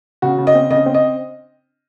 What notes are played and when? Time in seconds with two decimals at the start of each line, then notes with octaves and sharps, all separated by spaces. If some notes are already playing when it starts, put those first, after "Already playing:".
0.22 C#3 F#4
0.38 C#3
0.47 D#5
0.55 C4
0.70 C#3 D#5
0.86 C4
0.94 D#5